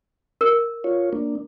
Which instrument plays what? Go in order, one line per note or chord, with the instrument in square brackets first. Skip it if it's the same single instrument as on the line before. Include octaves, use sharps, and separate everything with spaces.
[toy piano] A#4
[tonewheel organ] F4 C#5
A#3 D4